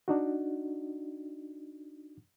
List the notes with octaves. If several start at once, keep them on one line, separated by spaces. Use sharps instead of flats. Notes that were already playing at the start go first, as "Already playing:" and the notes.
D4 D#4 F#4